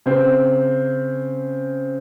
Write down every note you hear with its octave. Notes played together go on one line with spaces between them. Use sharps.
C#3 C4